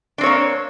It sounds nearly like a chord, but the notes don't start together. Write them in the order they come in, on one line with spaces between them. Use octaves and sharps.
D4 C4 C#5 A#3